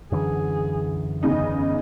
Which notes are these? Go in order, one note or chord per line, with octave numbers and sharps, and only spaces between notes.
F#2 D3 E3 G#4
E2 C#3 D#4 D#5